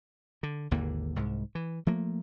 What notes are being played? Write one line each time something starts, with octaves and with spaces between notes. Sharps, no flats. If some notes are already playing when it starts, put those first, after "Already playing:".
D3
G#1 D#2 D3 A#3
C2 G#2
E3
F3 A3 A#3